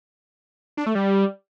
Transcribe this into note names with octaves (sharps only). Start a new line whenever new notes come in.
D4
A3
G3